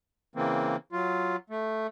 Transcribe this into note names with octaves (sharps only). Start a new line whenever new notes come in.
C#3 E3 A#3 C4
F#3 F4
A3